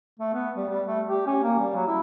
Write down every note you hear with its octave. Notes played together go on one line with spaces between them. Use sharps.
A3
B3
G3
G3
A3
G4
C#4
A#3
G3
F#3
E4